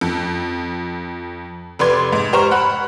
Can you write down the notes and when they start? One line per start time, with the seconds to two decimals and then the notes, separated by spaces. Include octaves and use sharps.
0.01 F2
1.79 F1 B4 D5 C6 G#6
2.13 G#2
2.33 G4 C5 A#5 C#6 F6
2.51 F#5 B5 F#6